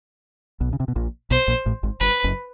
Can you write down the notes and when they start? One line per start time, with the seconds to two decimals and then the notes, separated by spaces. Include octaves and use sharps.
0.60 B1 B2
0.73 C#3
0.80 C3
0.88 B2
0.96 A#1 A#2
1.31 B1 B2 C5
1.48 A#1 A#2
1.66 A1 A2
1.83 G#1 G#2
2.01 G1 G2 B4
2.24 F#1 F#2